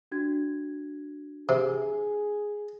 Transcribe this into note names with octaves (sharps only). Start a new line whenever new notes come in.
D4 F#4 G#6
C3 G#4